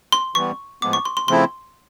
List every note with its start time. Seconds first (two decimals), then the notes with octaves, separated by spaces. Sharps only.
0.12 C6
0.35 E3 G3 B3 C#6
0.82 A2 F3 G#3 B3 D6
0.93 C#6
1.05 C6
1.17 C6
1.28 C#3 F3 A3 C4 E4 C6